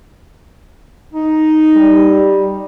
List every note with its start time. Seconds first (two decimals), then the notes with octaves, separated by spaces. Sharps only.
1.14 D#4
1.76 G3